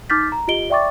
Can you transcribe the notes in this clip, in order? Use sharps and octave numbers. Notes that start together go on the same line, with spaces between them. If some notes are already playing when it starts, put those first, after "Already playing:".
D#4 D6 F6 G6 A6 B6
A#5
F4 G4 D#5 D7 G7
D5 E5 G5 C#6 D6 A6